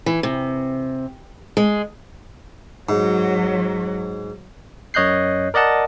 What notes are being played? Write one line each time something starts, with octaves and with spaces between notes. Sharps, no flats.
E3
C3
G#3
G#2 F#3
F#2 C#5 D#5 F#6 G6 C7
A#4 D5 D#5 F#5 A5